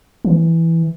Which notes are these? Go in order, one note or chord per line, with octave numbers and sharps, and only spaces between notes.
E3